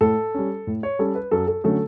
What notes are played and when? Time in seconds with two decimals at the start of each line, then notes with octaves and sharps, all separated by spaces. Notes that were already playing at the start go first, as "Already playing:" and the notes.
0.01 A2 A4
0.34 G3 C#4
0.67 A2
0.83 C#5
0.99 G3 C#4 A4
1.15 B4
1.31 F#2 A4
1.48 A4
1.64 D3 F#3 A3 C#4 A4